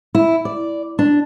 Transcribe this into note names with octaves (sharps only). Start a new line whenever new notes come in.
E4
D5
D4